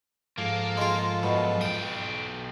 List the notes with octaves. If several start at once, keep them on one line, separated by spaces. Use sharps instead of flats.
G#2 F3 A#3 A4
G#3 F4
F#2 B2
B1 G5 D#6